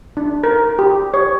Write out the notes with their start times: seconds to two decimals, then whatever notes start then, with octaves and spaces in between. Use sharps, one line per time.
0.17 D4
0.44 A#4
0.79 G4
1.14 C#5